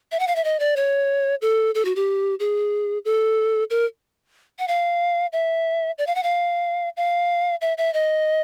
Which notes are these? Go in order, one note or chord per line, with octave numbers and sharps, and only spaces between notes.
E5
F#5
F5
E5
D#5
D5
C#5
A4
A4
F#4
G4
G#4
A4
A#4
F#5
F5
E5
D5
F5
F#5
F5
F5
E5
E5
D#5